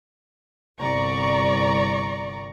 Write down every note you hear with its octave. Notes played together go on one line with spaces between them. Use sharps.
G1 C2 D5 A#5 C#6